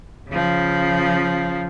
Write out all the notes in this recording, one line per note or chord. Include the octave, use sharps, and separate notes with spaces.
C#3 F3